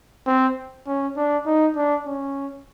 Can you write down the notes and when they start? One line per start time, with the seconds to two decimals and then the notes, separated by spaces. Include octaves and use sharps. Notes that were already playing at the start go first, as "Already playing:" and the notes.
0.27 C4
0.87 C#4
1.17 D4
1.46 D#4
1.76 D4
2.06 C#4